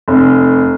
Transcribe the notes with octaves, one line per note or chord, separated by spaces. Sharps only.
F1